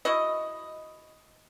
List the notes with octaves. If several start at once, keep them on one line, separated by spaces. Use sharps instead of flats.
E4 F#4 D#5